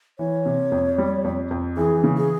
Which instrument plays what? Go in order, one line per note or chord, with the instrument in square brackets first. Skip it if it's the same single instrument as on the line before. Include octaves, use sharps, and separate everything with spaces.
[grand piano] E3 [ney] C#5
[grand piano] C3
F2
G3
F2
F2
[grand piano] E3 [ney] G#4
[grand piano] C#3
[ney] G#4